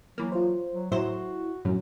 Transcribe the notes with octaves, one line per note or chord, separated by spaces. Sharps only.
E3 F#3 A#3
F4 C5
F#3
A2 F#3 E4 F#4 C5
F#2 A2 F#3 C#4